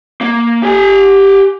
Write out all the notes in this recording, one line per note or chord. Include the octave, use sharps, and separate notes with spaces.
A#3
G4 G#5